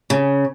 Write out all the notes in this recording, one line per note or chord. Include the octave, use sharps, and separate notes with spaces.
C#3